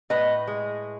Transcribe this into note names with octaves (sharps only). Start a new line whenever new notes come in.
A2 B4 D#5
G#3